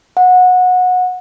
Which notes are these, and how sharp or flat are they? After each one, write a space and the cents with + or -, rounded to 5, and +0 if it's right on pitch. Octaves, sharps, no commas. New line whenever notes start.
F#5 -20